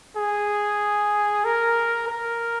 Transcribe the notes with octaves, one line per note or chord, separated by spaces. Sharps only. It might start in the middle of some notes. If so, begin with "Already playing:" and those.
G#4
A#4
A#4